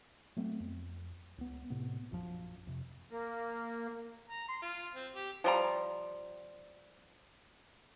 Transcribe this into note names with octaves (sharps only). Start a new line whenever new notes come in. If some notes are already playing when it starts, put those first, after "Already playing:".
F#3 A3 B3 C4
F2
C#2 B3
A2 C3 B3
A#1 F#2 D3 F3
F2 C3
A#3
A#5
C6
F4
C4
G4
F3 G3 A#5